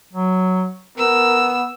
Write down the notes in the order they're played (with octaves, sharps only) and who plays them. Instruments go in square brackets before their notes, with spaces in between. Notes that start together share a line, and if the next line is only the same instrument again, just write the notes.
[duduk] F#3
[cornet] B3 [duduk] A#4 [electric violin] E6